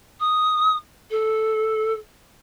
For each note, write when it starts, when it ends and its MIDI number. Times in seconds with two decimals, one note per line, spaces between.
0.19 0.76 87
1.10 1.93 69